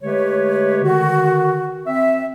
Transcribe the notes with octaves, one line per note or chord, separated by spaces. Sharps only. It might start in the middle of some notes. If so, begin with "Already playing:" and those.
D3 G#3 A3 G4 B4 C#5
D3 D#3 F#4
C4 E5